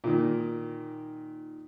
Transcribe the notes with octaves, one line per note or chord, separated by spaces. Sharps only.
A#2 D#3